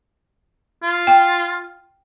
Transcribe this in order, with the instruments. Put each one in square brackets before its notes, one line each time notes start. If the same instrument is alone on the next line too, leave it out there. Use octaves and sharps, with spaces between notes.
[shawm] F4
[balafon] G5